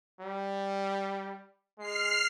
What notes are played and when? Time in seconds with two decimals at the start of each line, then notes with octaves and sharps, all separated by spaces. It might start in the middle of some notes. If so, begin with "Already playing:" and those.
0.21 G3
1.79 G#3 F6 C7